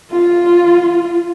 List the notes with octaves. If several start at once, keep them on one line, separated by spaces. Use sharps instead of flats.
F4